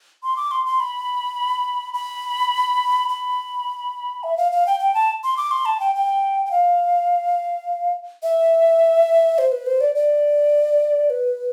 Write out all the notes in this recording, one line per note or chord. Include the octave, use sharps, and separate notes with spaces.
C6
D6
C6
C6
B5
B5
B5
E5
F5
F5
G5
G5
A5
C6
D6
C6
A5
G5
G5
G5
F5
E5
C5
B4
C5
D5
D5
B4